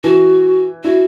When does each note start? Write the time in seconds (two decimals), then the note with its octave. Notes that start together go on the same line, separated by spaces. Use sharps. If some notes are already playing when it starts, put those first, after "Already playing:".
0.04 E3 F#4
0.84 E4 F#4